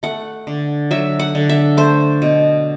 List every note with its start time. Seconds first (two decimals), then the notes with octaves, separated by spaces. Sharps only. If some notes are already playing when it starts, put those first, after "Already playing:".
0.03 A3 F#5
0.47 D3
0.91 F#3 E5
1.19 F#5
1.35 D3
1.49 E5
1.77 A3 C5
2.22 B2